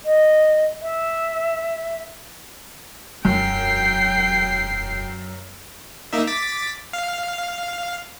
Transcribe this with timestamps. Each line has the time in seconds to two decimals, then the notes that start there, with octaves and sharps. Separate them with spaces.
0.05 D#5
0.82 E5
3.25 E1 F#2 G5 C7
6.13 A#3 D#4 E5
6.27 D6 A6 B6
6.93 F5